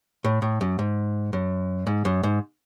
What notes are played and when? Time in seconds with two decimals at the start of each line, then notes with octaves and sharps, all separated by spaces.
0.24 A2
0.42 A2
0.61 F#2
0.79 G#2
1.33 F#2
1.87 G#2
2.05 F#2
2.23 G#2